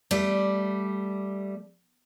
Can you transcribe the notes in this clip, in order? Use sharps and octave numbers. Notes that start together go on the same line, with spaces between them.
G3 A3 D5